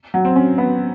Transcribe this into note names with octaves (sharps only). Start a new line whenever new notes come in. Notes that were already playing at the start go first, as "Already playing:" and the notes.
F#3
C4
C#4
B3